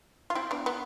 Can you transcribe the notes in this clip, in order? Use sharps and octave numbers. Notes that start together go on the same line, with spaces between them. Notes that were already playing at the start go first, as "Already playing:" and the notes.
F4
C4 E4
B3 D4
B3